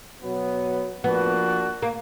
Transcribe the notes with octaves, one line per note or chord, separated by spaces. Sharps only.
B2 F#3 B3
F3 A#3 B3 D4 F#4
A#3